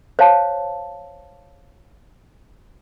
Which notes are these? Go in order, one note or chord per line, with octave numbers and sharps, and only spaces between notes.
C5 C#5 F5 A5